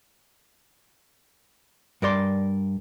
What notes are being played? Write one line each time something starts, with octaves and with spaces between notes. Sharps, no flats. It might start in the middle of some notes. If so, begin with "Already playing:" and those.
G2 A#4 D5 C6